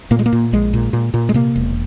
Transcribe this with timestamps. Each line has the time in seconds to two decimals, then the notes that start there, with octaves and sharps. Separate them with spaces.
0.11 A#2 A#3
0.19 G#3
0.26 A#3
0.33 A#2
0.53 A#1 G#3
0.74 A#2
0.93 A#2
1.14 A#2
1.29 G#3
1.34 C3 A#3
1.56 E1